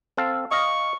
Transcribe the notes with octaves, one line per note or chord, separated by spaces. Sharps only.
C4 A4 F5
D#5 F5 C#6